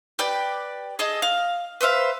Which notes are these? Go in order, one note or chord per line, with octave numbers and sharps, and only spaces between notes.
G4 B4 D5 G5
G#4 A4 D#5
F5
B4 C5 E5 F5